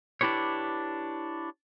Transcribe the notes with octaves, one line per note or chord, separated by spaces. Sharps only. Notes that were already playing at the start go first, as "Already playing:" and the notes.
D4 E4 G4 B4 C#5